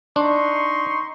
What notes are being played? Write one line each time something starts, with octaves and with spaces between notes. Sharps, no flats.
D4 D#4 C6 C#6